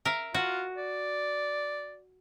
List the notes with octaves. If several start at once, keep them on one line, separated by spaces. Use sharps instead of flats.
A#4 E5 F5
F4 F#4
D5